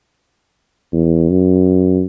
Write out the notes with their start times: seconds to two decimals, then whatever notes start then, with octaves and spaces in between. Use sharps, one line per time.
0.93 E2
1.30 F#2